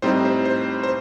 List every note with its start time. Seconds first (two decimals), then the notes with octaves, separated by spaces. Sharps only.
0.02 A2 G3 C4 D#4 C5
0.25 C5
0.45 C5
0.83 C5